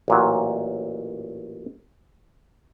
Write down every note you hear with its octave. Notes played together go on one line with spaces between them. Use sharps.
A1 A#2 F#3